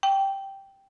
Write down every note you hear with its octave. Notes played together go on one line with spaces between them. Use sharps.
G5